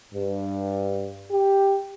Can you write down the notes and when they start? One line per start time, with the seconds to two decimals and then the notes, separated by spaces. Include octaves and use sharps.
0.14 G2
1.30 G4